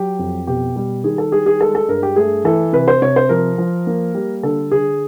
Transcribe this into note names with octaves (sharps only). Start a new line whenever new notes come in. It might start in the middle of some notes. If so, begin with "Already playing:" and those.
Already playing: F#3 G4
F2
B2 G4
G3
D#3 G#4
A4
G3 G#4
G#4
G#3 A4
A4
G2 A#4
G4
A3 G#4
E3 A4
C3 B4
C5
C3 C#5
C5
F3 A#4
F3
A#3
G3
D3 A4
D3 G#4